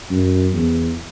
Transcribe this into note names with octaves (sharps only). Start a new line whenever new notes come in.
F#2
E2